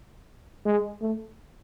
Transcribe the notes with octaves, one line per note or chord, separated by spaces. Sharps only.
G#3
A3